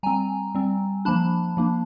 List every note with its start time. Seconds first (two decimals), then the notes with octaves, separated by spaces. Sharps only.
0.03 G3 C4 G#5 A#5
0.55 G3 C4
1.05 F3 A#3 D4 A5 B5
1.57 F3 A#3 D4